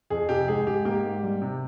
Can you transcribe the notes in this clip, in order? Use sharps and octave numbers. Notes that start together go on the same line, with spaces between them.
F2 G#4
C3 G4
G#2 G#4
G#2 G4
A#3 G4
G#2
G3
C3